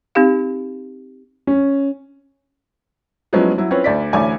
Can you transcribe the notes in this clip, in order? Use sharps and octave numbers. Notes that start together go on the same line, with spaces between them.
C4 D#4 G4 F5
C#4
F3 F#3 G#3 B3 C#4 E4
F#3 E4
C4 C#4 E4 F4 B4 C#5
D2 D5 B6
A1 D2 C#5 D5 G#5 D6